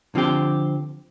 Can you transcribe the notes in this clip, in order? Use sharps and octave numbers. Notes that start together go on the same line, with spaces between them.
D3 F3 C4 G4